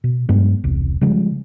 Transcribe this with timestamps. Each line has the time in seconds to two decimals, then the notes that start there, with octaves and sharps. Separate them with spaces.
0.04 B2
0.29 G2 F#3 G#3 B3
0.64 E1 C2
1.01 C#3 F3 G3 G#3